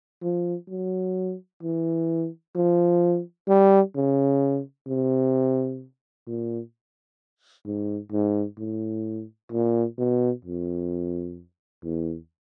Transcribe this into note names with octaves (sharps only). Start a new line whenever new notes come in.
F3
F#3
E3
F3
G3
C#3
C3
A#2
G#2
G#2
A2
A#2
B2
F2
E2